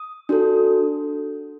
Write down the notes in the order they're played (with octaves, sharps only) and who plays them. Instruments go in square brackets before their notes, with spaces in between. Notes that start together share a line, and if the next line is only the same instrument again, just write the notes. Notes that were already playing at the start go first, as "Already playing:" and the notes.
Already playing: [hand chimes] D#6
D4 F#4 A4